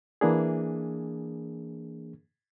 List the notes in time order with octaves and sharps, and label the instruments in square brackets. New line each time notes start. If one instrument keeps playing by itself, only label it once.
[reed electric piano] E3 A#3 D4 G#4